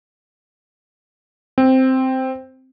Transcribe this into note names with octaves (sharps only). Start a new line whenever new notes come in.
C4